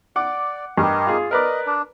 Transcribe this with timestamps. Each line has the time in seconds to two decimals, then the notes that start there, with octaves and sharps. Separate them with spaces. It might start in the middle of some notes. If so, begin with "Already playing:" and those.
0.16 D5 F#5 D6
0.78 G2 G4 A#4 D#5
1.07 F4 G#4
1.31 A#4 B4 D5 D#5
1.67 D4